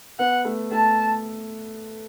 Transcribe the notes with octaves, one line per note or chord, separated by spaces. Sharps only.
B3 F#5
A3
A3 A5